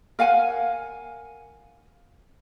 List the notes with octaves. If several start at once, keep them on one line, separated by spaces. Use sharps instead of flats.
A#4 F5 F#5 G#5